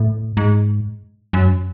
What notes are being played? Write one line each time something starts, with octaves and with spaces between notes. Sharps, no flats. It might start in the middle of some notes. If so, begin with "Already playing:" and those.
Already playing: A2
G#2
F#2